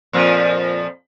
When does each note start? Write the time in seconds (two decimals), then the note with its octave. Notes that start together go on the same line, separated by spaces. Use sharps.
0.13 F2 A#2 F3